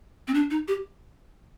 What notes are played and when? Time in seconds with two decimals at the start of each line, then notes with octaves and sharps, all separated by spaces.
0.28 C4
0.34 D4
0.50 D#4
0.68 G4